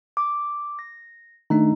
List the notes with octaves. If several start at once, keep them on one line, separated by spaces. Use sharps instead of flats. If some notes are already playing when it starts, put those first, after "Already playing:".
D6
A#6
D#3 A3 D4 D#4